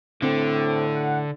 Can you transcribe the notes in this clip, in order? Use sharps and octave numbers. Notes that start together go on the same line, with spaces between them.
A2 D3 C4
F#5